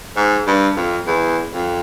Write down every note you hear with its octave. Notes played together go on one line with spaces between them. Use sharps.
G#2
G2
F2
E2
F2